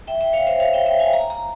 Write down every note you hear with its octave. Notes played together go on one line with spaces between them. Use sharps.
E5 G5
E5 G5
C#5 F5
C5 E5
C#5 F5
E5 G5
E5 G5
F5 G#5
A#5
A#5